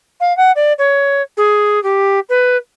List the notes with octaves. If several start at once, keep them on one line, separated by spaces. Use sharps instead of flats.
F5
F#5
D5
C#5
G#4
G4
B4